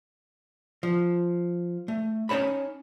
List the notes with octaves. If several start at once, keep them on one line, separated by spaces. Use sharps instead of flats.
F3
A3
C#4 D#4 C#5 A5 B5